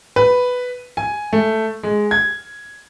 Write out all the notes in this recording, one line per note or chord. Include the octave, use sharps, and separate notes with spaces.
B4
G#5
A3
G#3
G#6